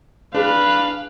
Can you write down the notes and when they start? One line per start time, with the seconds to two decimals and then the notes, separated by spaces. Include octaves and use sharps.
0.35 D4 G#4 B4 F5